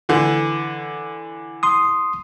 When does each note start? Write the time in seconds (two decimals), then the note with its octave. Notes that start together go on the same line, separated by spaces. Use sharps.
0.09 D3 E3
1.63 C6 D#6